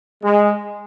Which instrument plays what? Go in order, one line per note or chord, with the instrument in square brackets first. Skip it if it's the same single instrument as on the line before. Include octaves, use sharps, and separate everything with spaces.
[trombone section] G#3